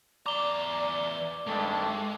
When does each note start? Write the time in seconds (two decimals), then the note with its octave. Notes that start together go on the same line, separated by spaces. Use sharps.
0.26 E2 D5 A#5 D6 G7
1.47 G#1 G2 G#3 A3